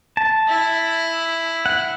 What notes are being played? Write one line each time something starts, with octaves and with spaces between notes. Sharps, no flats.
A5
E4
F#5